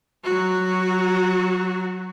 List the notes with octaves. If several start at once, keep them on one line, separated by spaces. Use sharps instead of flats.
F#3 F#4